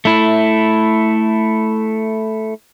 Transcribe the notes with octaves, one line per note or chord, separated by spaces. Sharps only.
A3 E4